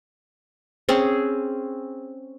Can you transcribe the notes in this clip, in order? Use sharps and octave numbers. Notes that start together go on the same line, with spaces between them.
C4 C#4 G#4